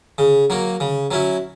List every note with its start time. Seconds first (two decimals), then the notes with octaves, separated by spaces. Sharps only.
0.18 C#3
0.50 F#3 A#3
0.80 C#3
1.11 F#3 C#4 E4